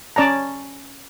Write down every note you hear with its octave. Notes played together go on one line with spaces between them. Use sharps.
C#4 D5 A5 A#5